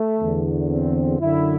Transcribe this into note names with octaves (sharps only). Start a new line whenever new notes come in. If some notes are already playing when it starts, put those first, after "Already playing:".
Already playing: A3
E2 D3
C4
F#2 D3 E4